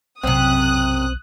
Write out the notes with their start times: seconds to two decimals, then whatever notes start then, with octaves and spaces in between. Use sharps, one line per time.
0.23 B1 F#2 C3 C4 D#6 F#6